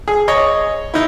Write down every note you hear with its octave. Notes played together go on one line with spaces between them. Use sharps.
G#4
C#5 D#5
D#4 E4